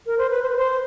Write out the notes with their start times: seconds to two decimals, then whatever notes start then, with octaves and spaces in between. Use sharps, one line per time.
0.06 A#4
0.18 C5
0.31 B4
0.43 C5
0.50 B4
0.57 C5